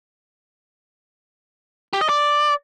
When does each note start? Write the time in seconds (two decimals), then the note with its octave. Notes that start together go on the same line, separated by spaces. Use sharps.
1.93 G4
2.01 D#5
2.09 D5